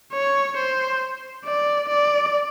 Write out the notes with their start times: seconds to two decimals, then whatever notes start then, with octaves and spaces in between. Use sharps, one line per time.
0.13 C#5
0.57 C5
1.45 D5
1.90 D5